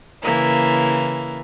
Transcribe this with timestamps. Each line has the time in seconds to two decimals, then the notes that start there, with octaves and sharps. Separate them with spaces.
0.22 C#3 E3 A#3 E4